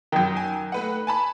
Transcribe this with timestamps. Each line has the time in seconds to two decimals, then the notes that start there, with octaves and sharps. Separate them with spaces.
0.12 F#2 D#3
0.37 G#5
0.72 A3 B4 F#5
1.07 G#5 A5 B5